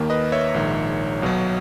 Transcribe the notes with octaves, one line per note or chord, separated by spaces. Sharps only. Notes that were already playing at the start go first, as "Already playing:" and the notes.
Already playing: D#2 D#3 A#3
B4 D#5
C#5 E5
A#1 G#2 D#3
B1 B2 F#3